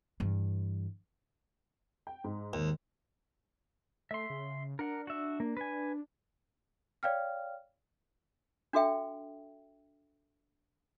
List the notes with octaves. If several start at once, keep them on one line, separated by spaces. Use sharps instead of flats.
G2 E3
G5
G#2
D#2
A3 E5 C6
C#3
D4 A#4 F#5
F#4 E5
A#3
B4 G#5
C#5 D5 F5 G5 F6
D4 F#4 A4 E5 G5